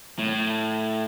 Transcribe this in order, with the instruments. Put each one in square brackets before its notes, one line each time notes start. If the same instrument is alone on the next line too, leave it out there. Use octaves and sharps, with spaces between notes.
[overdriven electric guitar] A2